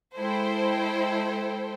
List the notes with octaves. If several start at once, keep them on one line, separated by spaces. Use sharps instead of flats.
G#3 E4 A4 C5 G5